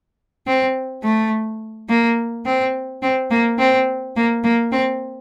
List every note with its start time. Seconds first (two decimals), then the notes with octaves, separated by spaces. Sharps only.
0.47 C4
1.03 A3
1.89 A#3
2.46 C4
3.02 C4
3.31 A#3
3.59 C4
4.16 A#3
4.44 A#3
4.72 C4